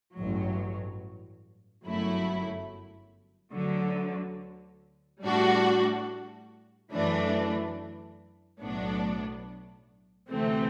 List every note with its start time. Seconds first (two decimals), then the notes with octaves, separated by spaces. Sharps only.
0.16 A1 G2 F#3
1.85 G1 F#2 F#3 A3 E4
3.53 D2 D3 F#3
5.23 A2 G3 D4 F#4
6.91 F#2 E3 A3 D4
8.60 B1 A2 F#3 B3 D4
10.30 D2 C3 E3 A3 C4